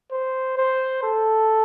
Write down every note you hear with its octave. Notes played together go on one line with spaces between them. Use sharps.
C5
C5
A4